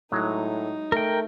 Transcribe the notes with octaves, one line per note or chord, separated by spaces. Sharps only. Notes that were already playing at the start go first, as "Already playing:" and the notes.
A2 F#3 G#3 D#4
A3 A#4 G5